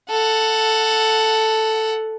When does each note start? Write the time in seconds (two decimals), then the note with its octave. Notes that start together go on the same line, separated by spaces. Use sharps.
0.10 A4 F#5